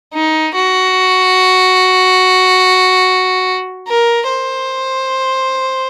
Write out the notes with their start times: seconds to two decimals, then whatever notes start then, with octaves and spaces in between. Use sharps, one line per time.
0.14 D#4
0.55 F#4
3.88 A#4
4.29 C5